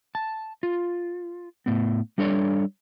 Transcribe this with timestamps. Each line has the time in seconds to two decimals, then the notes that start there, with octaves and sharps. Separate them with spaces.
0.15 A5
0.63 F4
1.66 A2 B3
2.18 G3 D4 A4 C#5 D5